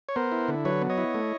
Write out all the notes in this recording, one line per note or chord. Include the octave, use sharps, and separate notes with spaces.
C#5
B3 A#4 C5
E4
D3
F#3 B4 C#5
B3
C#5 D#5
E4
A3